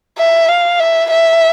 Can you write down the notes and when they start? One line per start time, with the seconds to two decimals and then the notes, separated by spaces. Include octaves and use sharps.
0.18 E5
0.49 F5
0.80 E5
1.10 E5